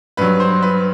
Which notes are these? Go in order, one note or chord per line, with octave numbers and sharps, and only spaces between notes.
G2 F#3 B4
C5
B4